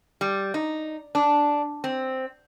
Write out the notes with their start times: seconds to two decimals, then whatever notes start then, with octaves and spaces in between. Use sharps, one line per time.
0.21 G3
0.54 D#4
1.15 D4
1.84 C4